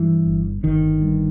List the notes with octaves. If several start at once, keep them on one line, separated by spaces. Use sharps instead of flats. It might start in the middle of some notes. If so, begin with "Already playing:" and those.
Already playing: G2 E3
G1
G1 D#3
G2